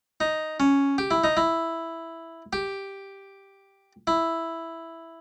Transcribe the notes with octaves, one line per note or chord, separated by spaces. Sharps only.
D#4
C#4
G4
E4
D#4
E4
G4
E4